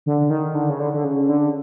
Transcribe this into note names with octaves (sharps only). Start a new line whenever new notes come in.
D3
D#3
D3
C#3
D3
D3
C#3
D3